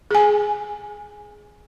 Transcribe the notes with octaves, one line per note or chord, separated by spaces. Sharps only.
G#4 G#5